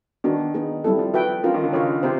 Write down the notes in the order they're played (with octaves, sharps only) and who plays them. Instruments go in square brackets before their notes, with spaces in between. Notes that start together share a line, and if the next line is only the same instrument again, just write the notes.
[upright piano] D#3 [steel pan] B3 D4 F#4
[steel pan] B3 D#4 G#4
G3 C4 E4 A4
[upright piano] F3
[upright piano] F3 [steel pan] F#4 B4 E5 G5
[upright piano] F3 [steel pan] C#4 F4 A#4
[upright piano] D#3
D3
[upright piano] C#3 [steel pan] F4 A#4 C#5
[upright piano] C3 [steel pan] G4 C5